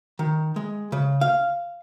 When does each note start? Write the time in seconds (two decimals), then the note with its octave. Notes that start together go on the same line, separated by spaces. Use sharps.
0.19 D#3
0.56 G#3
0.92 C#3
1.21 F5